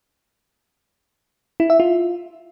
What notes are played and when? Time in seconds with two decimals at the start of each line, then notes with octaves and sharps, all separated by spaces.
1.60 E4
1.70 E5
1.80 F4